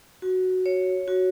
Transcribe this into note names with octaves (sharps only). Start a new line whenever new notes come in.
F#4
C#5
F#4